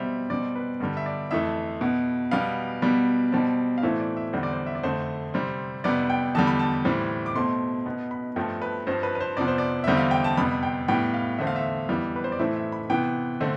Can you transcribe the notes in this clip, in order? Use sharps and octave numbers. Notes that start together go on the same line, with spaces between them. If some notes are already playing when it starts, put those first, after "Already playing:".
Already playing: B2 G3 C4 E5
B2 G3 C4 D5
B4
G2 D3 G3
E5
D5
F2 E3 A3 E5
B2 B3
B2 G3 B3 F5
B2 G3 B3
B2 G3 C4 A5
F5
A2 E3 A3 C4 E5
D5
E5
E2 D3 G3 C4 C5
D5
C5
E5
D5
F2 D3 A3 C4 C5
C3 G3 C4
F2 C3 G3 B3 D5
G5
E2 D3 G3 A5
B5
A5
A2 E3 G3 C4
D6
B2 A3 C4 C6
B2 B3
B5
G2 F3 A3 C4 G5
B4
G2 F3 C4 C5
B4
B4
C5
F2 C3 F3 B3 D5
C5
D5
E2 D3 G3 C4 E5
F5
G5
A5
F2 C3 G3 B3 B5
G5
A2 G3 B3 G5
F5
E2 D3 A3 C4 E5
F5
E5
F2 E3 G3 B3
B4
C5
D5
A2 E3 A3 C4 E5
E5
B5
C3 E3 B3 G5
D3 A3 C4